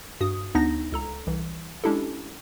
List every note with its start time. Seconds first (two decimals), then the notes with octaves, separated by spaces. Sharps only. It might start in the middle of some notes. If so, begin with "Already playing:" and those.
0.20 G2 F#4 D#6
0.55 D2 B3 D4 D#4 A#6
0.92 C#2 A4 A#5
1.27 C2 E3
1.84 G#3 C#4 D4 E4 G4 A4